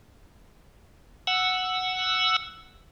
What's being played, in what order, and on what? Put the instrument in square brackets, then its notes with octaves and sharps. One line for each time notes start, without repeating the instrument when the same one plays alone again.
[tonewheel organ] F#5 E6